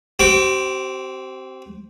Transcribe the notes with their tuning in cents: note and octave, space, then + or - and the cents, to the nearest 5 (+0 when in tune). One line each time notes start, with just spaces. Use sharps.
C4 +0 G4 -45 D6 +0